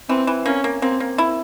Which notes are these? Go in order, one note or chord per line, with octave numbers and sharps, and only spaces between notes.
E3 C4
E3
A#3 C#4
A#3
A#3 C4
A#3
E4